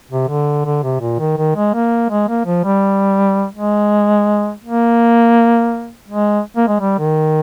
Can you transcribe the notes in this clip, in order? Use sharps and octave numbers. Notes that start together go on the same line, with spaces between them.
C3
D3
D3
C3
A#2
D#3
D#3
G#3
A#3
G#3
A#3
F3
G3
G#3
A#3
G#3
A#3
G#3
G3
D#3